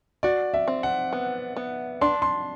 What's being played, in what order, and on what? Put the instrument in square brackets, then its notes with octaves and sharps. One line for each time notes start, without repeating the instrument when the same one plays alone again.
[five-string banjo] F#4 [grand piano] D5
[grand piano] E5
[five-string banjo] C4
[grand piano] F#5
[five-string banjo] B3
B3
[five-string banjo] D4 [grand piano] C6
[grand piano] C6